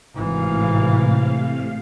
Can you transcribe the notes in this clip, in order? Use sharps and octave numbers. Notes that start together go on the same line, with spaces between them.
G#1 A2 C3 E3 F5